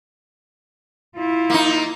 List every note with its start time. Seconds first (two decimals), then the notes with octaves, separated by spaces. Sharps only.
1.16 E4 F4
1.50 A#3 D#4